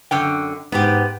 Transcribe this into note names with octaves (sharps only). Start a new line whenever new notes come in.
F#2 D3 G5
G#2 B3 D#4 G4